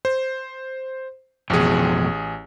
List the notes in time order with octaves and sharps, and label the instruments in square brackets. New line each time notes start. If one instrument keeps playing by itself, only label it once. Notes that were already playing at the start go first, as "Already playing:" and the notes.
[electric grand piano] C5
[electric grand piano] A1 G#4 [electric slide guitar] F2 B2